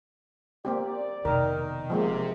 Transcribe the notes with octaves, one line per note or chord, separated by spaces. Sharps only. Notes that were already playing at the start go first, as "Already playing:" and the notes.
A#3 C4 G4 D5
F1 B2 D#3 A#4
C3 F3 G#3 A#3